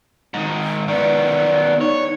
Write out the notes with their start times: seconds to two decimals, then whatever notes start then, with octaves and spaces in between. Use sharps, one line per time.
0.34 G#2 D#3
0.88 D#3 B3 D5
1.81 D#4 C#5